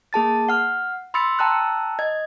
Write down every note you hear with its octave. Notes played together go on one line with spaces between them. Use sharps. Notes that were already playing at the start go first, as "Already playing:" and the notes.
A#3 G#4 A5 A6
F#5 F6
B5 C6 E6 A6 C#7
G5 A5 A#5 E6 F#6
D#5 G#6